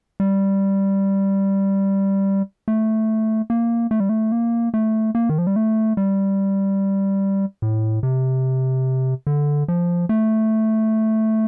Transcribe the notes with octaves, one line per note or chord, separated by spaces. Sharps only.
G3
A3
A#3
A3
G3
A3
A#3
A3
A#3
D#3
F3
G3
A3
G3
A2
C3
D3
F3
A3